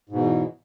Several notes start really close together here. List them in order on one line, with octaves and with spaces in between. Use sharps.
G#2 B2 E2